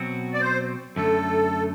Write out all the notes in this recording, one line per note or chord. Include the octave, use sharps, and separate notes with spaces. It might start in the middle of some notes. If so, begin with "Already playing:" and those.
Already playing: B2 F#3 C4 F#4
D5
C5
F#2 D3 A3 A4